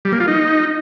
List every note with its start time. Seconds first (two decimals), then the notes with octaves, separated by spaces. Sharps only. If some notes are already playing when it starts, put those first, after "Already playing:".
0.05 G3
0.13 A#3
0.20 F4
0.28 D#4